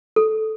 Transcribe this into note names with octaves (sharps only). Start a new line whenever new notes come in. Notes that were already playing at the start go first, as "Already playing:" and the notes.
A4